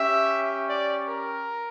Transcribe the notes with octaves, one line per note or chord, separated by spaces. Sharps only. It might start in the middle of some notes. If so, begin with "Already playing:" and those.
Already playing: C#4 G4 E5
D5
A#4